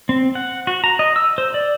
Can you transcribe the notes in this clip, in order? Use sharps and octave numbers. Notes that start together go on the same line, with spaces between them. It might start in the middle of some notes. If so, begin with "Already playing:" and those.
C4
F#5
F#4
A#5
D#5
E6
C5
D5